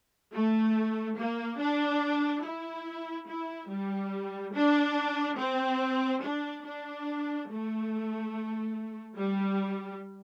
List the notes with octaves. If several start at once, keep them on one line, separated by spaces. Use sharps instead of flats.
A3
A#3
D4
E4
E4
G3
D4
C4
D4
D4
A3
G3